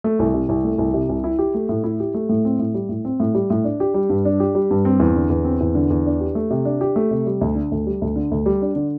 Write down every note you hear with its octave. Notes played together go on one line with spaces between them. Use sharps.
A3
C2
C3
C2
A3
C2
C3
C2
E4
G4
A3
A2
E4
G4
A3
A2
C4
A2
G3
A2
C4
A2
G3
A2
D4
G4
G3
G2
D4
G4
G3
G2
C4
E2
D3
E2
C4
E2
D3
E2
D4
G4
A3
C3
D4
G4
A3
C3
G3
D2
D3
D2
G3
D2
D3
D2
G3
D4
D3